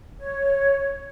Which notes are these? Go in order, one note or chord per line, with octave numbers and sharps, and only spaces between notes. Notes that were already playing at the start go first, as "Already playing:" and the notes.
C#5